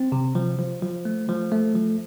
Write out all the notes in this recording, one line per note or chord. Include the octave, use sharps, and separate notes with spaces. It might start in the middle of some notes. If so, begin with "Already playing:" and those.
Already playing: C4
C3
F3
F3
F3
A3
F3
A3
F3